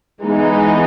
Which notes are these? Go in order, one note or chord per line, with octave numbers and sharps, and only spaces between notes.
E3 G#3 B3 D#4